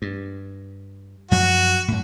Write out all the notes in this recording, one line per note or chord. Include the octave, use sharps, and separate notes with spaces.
G2
F#2 F3 F#3 F#4
F#2 A2